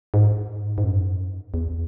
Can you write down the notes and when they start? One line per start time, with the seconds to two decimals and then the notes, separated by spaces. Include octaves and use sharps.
0.14 G#2
0.78 G#2
0.84 F#2
1.54 E2